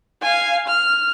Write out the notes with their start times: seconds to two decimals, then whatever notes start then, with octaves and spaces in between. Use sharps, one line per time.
0.22 F5 G#5
0.68 F6